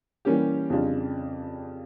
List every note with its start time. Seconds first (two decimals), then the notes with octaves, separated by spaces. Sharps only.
0.25 E3 G3 A#3 C#4 G4
0.70 F2 C#3 G3 D4 F4